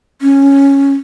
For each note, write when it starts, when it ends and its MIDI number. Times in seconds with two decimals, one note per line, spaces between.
0.22 0.93 61